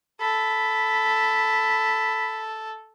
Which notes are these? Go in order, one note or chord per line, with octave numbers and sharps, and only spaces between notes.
A4 B5